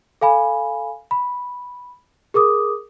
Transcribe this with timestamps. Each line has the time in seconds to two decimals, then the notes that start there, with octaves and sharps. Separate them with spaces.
0.21 A4 F5 G#5 B5
1.11 B5
2.34 G#4 A#4 D6 D#6